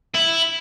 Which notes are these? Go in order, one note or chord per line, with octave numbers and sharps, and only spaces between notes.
E4